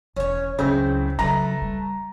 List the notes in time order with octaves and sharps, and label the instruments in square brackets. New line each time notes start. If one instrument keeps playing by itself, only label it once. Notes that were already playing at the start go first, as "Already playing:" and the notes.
[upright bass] E1 E3 [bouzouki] C#4 C#5
[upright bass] C#2 F#3 [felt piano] C#3 [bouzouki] C4 E4
[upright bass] C#3 F#3 [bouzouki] A3 B4 [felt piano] A#5
[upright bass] G3